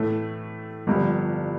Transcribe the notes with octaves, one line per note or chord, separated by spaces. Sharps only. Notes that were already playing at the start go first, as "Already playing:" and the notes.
Already playing: A2 E3 A3
G1 G2 F3